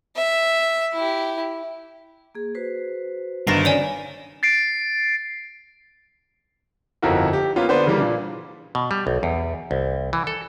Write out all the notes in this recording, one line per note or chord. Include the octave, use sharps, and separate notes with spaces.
E5
E4 G4
A#3 G#4
F#4 B4 C5
G1 D3 D#4 A#4 A6 A#6 C7 E7
C#3 C#5 D5 G#5
A6 C7 D7
G1 F2 D#4 E4 F#4 A#4
G4
A#3 B3 C#4 F4
D3 B3 B4 C5 D5
C#3 E3 G3 A#3
A#2 D4
B2
G3
B1
E2
C2
E3
A4